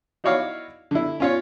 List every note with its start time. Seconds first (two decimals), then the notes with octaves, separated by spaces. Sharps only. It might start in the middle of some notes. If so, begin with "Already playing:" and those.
0.24 D#4 E4 F#4 C#5 D5 F5
0.91 D3 E4
1.20 C#4 F4 C#5